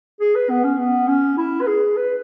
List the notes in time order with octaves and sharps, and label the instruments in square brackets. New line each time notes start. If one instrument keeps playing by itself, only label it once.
[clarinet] G#4
B4
B3
C#4
B3
C#4
E4
B4
G#4
B4